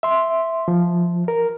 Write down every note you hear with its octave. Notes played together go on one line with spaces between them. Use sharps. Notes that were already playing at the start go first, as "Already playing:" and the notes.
E5 C6
F3
A#4